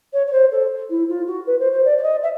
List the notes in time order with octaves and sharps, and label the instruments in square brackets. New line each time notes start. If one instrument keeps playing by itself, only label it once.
[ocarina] C#5
C#5
C5
A4
E4
F4
F#4
B4
C5
C5
D5
D5
D#5
E5